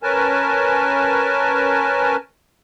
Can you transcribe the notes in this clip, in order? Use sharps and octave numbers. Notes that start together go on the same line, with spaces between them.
C#4 A#4 B4 G#5 A5